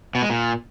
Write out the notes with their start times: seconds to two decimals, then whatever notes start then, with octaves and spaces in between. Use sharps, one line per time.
0.15 B2
0.22 G#3
0.30 A#2